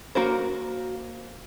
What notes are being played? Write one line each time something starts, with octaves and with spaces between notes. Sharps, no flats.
A#3 F#4 A#4 C5